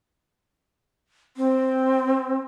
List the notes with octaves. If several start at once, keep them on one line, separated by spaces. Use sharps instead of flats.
C4